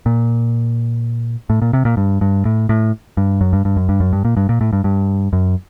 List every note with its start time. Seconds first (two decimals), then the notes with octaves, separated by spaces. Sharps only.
0.06 A#2
1.50 A2
1.62 A#2
1.73 C3
1.85 A#2
1.97 G2
2.21 G2
2.45 A2
2.69 A2
3.17 G2
3.41 F#2
3.53 G2
3.65 G2
3.77 F#2
3.89 G2
4.00 F#2
4.13 G2
4.25 A#2
4.37 G2
4.49 A#2
4.61 A2
4.73 G2
4.84 G2
5.33 F#2